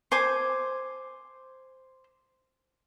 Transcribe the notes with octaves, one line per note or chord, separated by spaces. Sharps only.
C5 G#5 D6